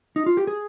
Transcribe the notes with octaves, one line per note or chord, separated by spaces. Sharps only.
D#4
F4
G4
G#4